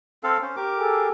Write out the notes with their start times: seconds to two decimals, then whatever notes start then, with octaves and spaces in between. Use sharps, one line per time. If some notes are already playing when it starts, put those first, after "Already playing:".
0.24 C4 A4 F5
0.42 C#4 C5
0.56 G4 A#4 D6
0.77 G#4 A4 G#5